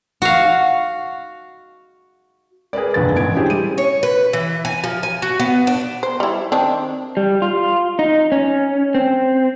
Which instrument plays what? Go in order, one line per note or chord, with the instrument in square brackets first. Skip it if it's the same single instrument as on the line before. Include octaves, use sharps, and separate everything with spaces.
[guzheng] F#4 F5
[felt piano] G#4 A#4 B4 D5
F1 A#1 D3 B4 A6
A1 B3 E4 G#6 D7
C#4 D4 E4 G4 G#4 C5
G3 D#7
[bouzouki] C#5
B4
E3
G#5
F3
G#5
F#4
B3
D4
[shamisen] C5
G3 E4
D#3 C4 D4
[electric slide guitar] G3
F4
D#4
C#4
C4